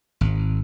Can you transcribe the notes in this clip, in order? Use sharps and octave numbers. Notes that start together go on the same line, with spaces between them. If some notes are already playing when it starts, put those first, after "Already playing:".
G#1